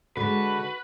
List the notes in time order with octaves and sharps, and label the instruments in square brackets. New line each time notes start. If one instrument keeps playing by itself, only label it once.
[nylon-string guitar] D3 G#3 [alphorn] F#4 [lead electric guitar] B4